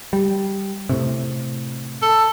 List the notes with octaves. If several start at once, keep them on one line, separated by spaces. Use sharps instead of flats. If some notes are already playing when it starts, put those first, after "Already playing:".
G3
A2 C3
A4